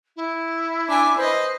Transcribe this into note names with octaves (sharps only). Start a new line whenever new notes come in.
E4
D4 G#5 D6
B4 C5 D#5